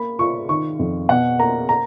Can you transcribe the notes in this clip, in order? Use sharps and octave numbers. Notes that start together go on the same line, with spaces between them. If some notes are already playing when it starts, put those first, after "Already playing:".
Already playing: A#3 B5
F4 C#6
D#3 C#6
F2
B2 F#5
A#3 A#5
A#5